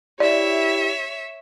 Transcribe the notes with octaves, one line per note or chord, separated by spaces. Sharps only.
E4 G4 C#5 D5 E5